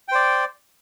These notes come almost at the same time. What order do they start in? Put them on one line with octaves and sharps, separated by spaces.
G5 C5 D5